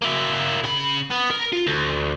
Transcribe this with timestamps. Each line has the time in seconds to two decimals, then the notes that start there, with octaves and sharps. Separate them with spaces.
0.02 A#3 E4
0.64 C#3 B5
1.10 B3
1.30 A#4
1.53 F4
1.67 D2